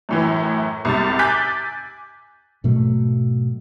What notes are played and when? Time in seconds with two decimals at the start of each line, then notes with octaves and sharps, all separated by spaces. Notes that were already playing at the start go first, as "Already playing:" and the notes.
0.09 F#2 A2 E3
0.85 C2 G#2 C3 A6
1.19 G#5 D6 F#6 G6 A6 B6
2.64 G#2 B2 F#3 A3